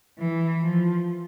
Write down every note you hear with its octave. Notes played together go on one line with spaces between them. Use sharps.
E3
F3